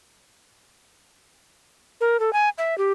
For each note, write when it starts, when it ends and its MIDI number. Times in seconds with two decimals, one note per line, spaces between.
2.01 2.20 70
2.20 2.33 69
2.33 2.49 80
2.58 2.77 76
2.78 2.92 67